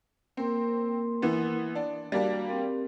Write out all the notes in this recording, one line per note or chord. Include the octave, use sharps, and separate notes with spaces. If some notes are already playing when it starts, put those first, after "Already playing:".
A#3 C4 A#4 C6
E3 B3
D4
G3 A#3 D4 F#4
C4 G4 A#4